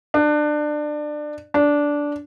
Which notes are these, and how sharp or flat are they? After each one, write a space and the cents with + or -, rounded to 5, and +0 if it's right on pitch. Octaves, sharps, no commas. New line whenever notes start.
D4 +25
D4 -10